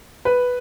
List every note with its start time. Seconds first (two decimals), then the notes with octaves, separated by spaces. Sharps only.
0.25 B4